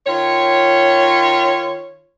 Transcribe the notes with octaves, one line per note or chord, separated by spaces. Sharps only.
D#3 F4 C#5